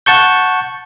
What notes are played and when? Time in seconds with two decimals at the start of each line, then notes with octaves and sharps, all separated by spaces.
0.06 F#5 A5 C#6 G6